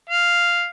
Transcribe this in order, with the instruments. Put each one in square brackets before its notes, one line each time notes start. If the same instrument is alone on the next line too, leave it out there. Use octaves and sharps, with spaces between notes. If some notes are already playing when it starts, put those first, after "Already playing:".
[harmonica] F5